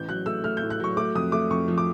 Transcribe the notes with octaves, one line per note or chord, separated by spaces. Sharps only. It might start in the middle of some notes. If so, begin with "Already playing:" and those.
Already playing: A1 G6
F#3 F#6
A3 E6
A3 F6
G6
A2
F#6
F#3 C#6
A3 D6
F2 D#6
A3 D6
F2 C#6
F3
D6